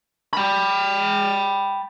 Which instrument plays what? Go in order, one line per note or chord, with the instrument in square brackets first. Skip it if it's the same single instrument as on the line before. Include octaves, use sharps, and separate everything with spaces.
[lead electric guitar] G5 B5